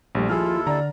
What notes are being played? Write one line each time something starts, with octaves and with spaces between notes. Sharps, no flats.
A#1 G3 A3
D#2 F3 E4 F4 G#4 A4 F6
D3 D5 A#5